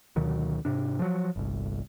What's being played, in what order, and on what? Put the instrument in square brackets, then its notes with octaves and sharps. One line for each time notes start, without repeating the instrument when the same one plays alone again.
[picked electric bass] D2 B2 D#3 F#3
G#2 C3 D4
F3 F#3
G1 C2